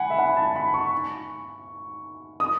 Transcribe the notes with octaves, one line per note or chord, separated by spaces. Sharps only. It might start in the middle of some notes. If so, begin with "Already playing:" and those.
Already playing: F#5 G#5 B5
E5
F#5
B5
A5
B5
C#6
D#6